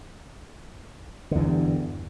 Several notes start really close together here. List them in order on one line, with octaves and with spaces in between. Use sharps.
D3 E2 G2